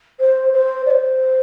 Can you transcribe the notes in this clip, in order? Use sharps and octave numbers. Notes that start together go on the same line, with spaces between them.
C5
C5
D5
C5